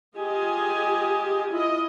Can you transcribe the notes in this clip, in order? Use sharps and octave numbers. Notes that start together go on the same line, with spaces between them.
F4 G4 G#4 D#5 G#5
E4 F4 D#5